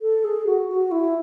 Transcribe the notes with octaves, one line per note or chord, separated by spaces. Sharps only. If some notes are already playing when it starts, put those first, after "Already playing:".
A4
G#4
F#4
F#4
E4